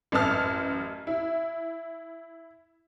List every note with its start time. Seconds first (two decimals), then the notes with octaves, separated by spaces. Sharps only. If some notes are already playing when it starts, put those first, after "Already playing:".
0.12 A1 F#2 A5 F6
1.07 E4